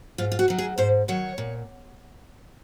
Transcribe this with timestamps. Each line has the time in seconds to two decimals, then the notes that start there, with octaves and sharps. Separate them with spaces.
0.18 G#2 F4
0.32 F4
0.39 F#4
0.48 D#3 F#3
0.59 G#4
0.78 G#2 C5
1.08 D#3 F#3 C#5
1.38 A#2